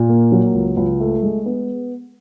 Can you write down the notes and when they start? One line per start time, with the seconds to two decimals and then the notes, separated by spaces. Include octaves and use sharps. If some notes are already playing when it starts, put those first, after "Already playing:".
Already playing: A#2
0.09 A#3
0.32 F#3
0.55 C#2
0.77 C#2
1.00 A3
1.23 G#3
1.46 B3